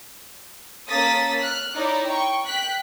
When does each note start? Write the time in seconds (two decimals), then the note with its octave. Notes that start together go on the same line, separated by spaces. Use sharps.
0.89 A#3 C#4 A4 D#6 A6 B6
1.42 F6 F#6
1.76 D#4 E4 C#5 D5
2.07 G5 C#6
2.46 G5 F#6 B6